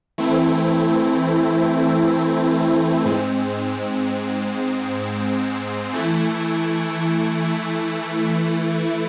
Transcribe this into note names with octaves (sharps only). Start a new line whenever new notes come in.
E3 A3 C4 E4
G#2 G#3 C4
E3 A3 E4